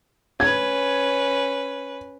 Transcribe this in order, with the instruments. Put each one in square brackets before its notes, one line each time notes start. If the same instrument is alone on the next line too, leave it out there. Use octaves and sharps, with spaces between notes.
[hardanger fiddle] C#4 B4 [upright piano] G#6